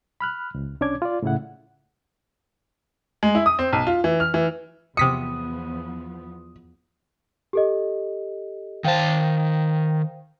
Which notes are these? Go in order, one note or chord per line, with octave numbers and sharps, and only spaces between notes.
B5 F6 F#6
C#2
C2 C#4 D4 C#5 D6 G#6
F4 D5
A2 C#3 E4 F#5
G#3
E4
D#6
C4
B1
F4
E3
F6
E3
E2 C3 F3 B3 D#6 B6 C#7
G4 A4 D#5
D#3 C5 F5 G5 A5